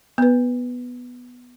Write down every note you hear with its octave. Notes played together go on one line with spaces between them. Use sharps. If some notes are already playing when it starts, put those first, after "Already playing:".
B3 B4